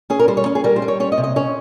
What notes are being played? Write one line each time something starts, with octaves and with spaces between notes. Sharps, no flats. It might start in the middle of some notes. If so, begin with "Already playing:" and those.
C#4 G#4
A#4
G3 C5
C#5
C#4
G#4
G3 A#4
C5
G3
C#5
C#4 C#5
D#5
C3
D#5
C#4 C#5